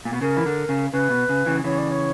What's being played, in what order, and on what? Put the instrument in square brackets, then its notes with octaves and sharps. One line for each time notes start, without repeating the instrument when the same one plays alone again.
[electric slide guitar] A#2
B2
[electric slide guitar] C#3 [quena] A#4
[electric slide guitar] E3
D3
C#3
[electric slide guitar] C#3 [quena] B4
[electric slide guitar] B2
C#3
C#3 E3
[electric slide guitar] C#3 E3 [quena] C#5
[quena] D5
C#5